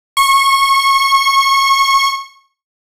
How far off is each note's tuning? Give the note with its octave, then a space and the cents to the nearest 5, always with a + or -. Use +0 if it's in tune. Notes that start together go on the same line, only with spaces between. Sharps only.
C#6 -25